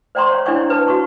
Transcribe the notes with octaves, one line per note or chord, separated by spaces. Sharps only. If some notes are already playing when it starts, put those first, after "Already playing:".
C5 D5 G5 A#5 C6 C#6
C#5 G5
D4 E4 C#5 D5 G5 C#6
B4 A5
F#4 C#6